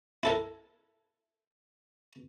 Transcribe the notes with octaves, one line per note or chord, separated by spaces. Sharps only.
E4 A4 A#4